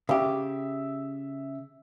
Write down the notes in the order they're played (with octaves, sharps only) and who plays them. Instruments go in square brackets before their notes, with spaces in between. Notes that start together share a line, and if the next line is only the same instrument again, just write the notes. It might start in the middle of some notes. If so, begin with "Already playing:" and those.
[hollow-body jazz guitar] C#3 G4 [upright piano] E5